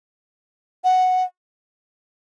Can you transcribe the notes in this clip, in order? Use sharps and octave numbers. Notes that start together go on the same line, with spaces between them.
F#5